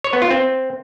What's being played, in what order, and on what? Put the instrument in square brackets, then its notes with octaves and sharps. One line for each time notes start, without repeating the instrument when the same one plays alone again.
[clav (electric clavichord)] C#5
B3
F4
C4